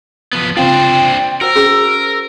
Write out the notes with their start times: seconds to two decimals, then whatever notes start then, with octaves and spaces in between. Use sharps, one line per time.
0.33 F3 B3
0.57 C#3 C4 D4 F4 C5 G5
1.41 F#4 A#4 C5 E6
1.56 C#4 G#4